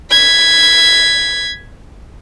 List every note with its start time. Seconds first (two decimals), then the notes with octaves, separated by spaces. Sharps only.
0.11 G#6 B6